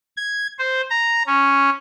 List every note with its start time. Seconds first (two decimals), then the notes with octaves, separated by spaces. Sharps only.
0.17 G#6
0.59 C5
0.90 A#5
1.27 C#4